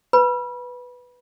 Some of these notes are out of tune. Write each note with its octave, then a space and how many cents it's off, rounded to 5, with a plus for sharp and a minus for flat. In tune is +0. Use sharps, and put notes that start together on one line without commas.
B4 +0 B5 -25